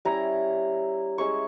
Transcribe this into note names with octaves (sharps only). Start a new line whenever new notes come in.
G3 C#4 E4 A#5
G#3 C#4 E4 C#6